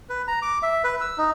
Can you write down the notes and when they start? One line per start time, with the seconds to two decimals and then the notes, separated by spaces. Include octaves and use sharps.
0.09 B4
0.28 A#5
0.42 D6
0.63 E5
0.84 B4
1.01 E6
1.18 D#4